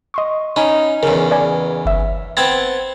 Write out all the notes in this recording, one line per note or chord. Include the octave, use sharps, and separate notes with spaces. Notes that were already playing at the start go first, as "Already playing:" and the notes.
D#5 C6 C#6
C#4 D#4 G#5 B5
E2 C#3 A#4
B4 D5 G#5
G1 E5
B3 C4 A5 G#6